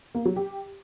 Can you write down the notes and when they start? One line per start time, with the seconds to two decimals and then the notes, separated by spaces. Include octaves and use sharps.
0.15 A#3
0.25 F#3
0.36 G4